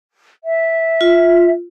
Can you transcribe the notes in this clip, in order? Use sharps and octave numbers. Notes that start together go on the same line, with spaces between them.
E5
F4